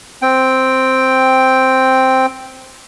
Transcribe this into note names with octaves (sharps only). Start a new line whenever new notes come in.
C4 G5